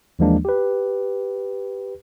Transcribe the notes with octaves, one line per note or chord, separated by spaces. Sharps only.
D#2 E3 F3 G#3 A#3 D4
G4 B4